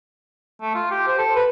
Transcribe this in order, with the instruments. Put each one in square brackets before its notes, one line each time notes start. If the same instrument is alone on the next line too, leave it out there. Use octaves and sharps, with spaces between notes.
[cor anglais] A3
F4
G4
C5
A4
B4